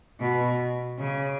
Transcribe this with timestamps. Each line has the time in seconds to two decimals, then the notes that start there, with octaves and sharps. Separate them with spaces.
0.20 B2
0.99 C#3